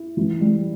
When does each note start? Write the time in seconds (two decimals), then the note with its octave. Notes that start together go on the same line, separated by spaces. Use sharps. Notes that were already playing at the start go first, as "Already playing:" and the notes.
Already playing: E4
0.17 E3
0.41 G3